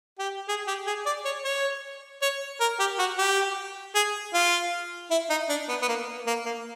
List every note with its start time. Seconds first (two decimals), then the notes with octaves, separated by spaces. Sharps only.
0.19 G4
0.48 G#4
0.67 G4
0.87 G#4
1.06 D5
1.25 C#5
1.44 C#5
2.22 C#5
2.60 A#4
2.79 G4
2.99 F#4
3.18 G4
3.95 G#4
4.34 F4
5.11 E4
5.30 D#4
5.49 D4
5.69 B3
5.82 B3
5.88 A#3
6.27 A#3
6.45 A#3